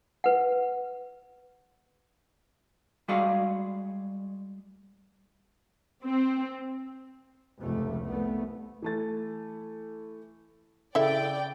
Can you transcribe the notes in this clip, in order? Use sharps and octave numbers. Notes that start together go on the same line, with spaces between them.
B4 F#5
G3 G#3 F#4 G#4 D5 F5
C4
F1 C#2 A3
C2 A3 B3
E3 A3 A6
C#3 E4 A4 D5 E5 G5